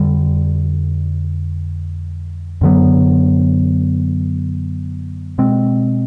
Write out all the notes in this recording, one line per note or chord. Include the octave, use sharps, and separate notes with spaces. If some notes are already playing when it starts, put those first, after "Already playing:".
Already playing: F2 D3 G3
F#2 D3 F#3 B3
B2 G#3 C4